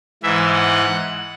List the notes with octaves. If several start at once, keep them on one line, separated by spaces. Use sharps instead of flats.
G#2 E3 E5
F#5